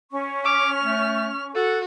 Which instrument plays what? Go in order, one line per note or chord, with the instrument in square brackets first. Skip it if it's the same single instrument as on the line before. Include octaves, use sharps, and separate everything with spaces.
[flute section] C#4 C#6
[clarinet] D6 [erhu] F6
[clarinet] A3
[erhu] F#4 [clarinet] A4